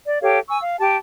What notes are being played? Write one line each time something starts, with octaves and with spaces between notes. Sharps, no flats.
D5
G4 A4 C#5 F5
G#5 C#6 E6
F5
G4 A5